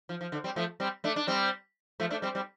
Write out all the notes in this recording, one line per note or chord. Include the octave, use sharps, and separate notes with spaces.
F3
F3
D3
G3 C4
F3 A3
G3 C4
A3 D4
D4
G3 C4
F3 A3
A3 D4
G3 C4
G3 C4